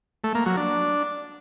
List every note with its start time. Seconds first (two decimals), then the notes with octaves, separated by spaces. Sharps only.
0.24 A3
0.35 A#3
0.46 F#3
0.57 D4